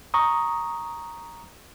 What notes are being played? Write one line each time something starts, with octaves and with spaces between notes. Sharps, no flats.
A#5 C#6 D#6